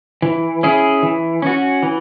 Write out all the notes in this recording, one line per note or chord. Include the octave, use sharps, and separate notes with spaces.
E3
C#4 E4 G#4
E3
C#4 F#4
E3